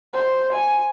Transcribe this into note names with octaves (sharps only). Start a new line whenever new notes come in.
C5
G#5